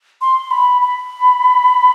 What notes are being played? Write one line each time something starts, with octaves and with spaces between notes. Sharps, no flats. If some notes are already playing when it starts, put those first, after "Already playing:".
C6
B5
B5